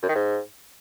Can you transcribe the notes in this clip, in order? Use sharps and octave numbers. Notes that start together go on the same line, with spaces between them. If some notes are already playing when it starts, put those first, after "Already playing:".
F#2
D#3
G#2